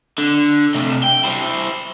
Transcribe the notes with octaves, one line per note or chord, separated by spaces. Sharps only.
D3
C3 A3
G5
E4 C5